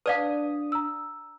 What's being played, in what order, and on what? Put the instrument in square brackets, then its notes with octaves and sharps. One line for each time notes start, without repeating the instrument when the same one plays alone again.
[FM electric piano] D4 D#6 [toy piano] B4 D5 F5
[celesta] A#5 E6